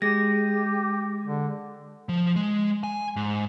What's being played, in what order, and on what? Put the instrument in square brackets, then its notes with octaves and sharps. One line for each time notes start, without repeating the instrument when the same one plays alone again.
[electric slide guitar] G#3 [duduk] G4 [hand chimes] A#6
[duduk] D3
[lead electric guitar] F3
G#3
G#5
G#2